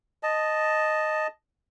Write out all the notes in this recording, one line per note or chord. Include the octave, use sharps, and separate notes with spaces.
D#5 A5